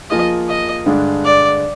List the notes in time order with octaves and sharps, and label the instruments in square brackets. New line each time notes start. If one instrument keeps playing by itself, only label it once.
[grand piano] F3 A#3 F4 G#4 [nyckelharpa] D#5
[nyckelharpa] D#5
[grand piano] G2 D3 G#3 D4
[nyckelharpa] D5